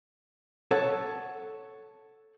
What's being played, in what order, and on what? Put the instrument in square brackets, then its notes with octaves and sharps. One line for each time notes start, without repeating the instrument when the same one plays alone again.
[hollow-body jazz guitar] A4 C#5 F#5